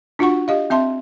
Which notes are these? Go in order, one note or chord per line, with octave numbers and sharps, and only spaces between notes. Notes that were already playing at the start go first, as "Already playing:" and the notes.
D4 F4 F#4 F#5 C#6
G4 D#5 F5
C4 E5 A5 C6